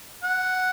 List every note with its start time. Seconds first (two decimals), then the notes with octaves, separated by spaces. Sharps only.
0.23 F#5